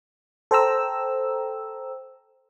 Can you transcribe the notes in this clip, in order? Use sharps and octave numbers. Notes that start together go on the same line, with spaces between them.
A4 C5 G5 A#5 E6